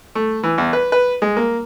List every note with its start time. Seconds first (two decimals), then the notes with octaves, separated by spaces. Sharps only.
0.15 A3
0.43 E3
0.58 E2
0.73 B4
0.92 B4
1.22 G#3
1.37 A#3